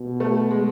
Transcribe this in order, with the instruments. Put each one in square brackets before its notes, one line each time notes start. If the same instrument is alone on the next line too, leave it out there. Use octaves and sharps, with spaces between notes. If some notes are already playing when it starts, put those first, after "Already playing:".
Already playing: [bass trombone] B2
[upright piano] A3
G#3